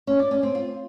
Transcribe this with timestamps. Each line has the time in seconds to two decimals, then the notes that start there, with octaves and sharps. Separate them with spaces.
0.07 C#4
0.19 D5
0.31 C#4
0.43 C4
0.55 F4